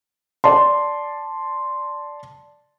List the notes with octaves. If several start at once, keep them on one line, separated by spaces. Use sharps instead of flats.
D5 A5 C6